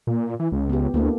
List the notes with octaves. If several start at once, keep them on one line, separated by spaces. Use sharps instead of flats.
A#2
E3
C#2
B3 G4
D2 A#3 E4 A4